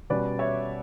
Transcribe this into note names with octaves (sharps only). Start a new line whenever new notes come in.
B2 G3 C#4 B4 D5
C#5 E5